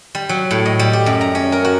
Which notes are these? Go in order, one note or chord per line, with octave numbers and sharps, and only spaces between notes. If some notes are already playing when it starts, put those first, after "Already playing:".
G3
F#3
A2
D#5
G3
G4
F#2
A#5
C#4
A#4
F#4